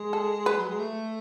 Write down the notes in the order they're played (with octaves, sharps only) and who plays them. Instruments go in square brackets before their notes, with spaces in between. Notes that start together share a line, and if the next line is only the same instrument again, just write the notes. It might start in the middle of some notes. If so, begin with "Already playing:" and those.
Already playing: [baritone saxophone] G#3
[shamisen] A4
B4
[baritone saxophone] F#3
G#3
A3